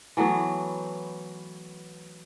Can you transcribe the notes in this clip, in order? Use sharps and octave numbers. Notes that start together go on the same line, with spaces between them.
E3 F#3 A3 B3